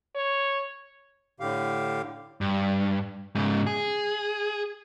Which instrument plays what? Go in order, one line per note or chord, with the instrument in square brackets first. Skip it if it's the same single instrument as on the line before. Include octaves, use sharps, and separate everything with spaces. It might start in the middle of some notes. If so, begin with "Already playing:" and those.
[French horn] C#5
[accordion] A2 D3 G4 F5
[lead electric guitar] G2
G#2 C#3
G#4